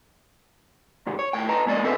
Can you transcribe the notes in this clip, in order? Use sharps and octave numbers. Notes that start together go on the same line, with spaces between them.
G#2 C3 D#3
C#5
D#2 A2 G5
B4 D#5 A5 A#5
C2 G#3 A#3 B3 D5 D#5
B2 C4 A4 B4 D#5 E5